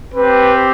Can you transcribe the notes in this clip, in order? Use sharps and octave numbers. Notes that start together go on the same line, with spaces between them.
C4 G4 B4